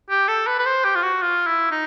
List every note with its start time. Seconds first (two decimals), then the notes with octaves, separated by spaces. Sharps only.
0.10 G4
0.28 A4
0.47 B4
0.59 B4
0.66 C5
0.84 G4
0.95 F4
1.03 F#4
1.22 F4
1.47 E4
1.71 D#4